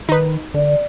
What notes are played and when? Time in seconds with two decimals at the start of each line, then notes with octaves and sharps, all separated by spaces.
0.09 D#3 D#4 B4
0.54 D3 D5